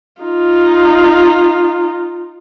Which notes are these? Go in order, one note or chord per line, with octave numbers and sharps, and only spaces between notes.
D#4 F4